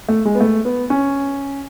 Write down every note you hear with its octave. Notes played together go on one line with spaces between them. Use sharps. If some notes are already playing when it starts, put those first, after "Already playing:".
A3
G#3
B3
A3
B3
C#4